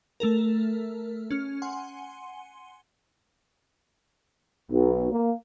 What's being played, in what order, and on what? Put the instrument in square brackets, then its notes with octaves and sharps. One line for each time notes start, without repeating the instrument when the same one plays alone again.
[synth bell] A3 A4 A#4
C#4 F6
F#5 G#5 C6
[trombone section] B1
A#3